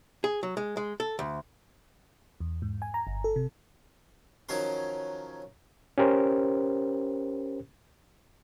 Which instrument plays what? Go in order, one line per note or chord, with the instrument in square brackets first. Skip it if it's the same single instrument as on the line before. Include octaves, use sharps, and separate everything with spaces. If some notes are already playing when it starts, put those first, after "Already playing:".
[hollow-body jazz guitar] G#4
F#3
G#3
G#3
A4
D2
[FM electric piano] E2
G#2
G#5
A#5
G1
A4
C3
[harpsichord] D#3 F3 F#3 C#4 A#4 C6
[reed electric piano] C#4 G4 A#4 C5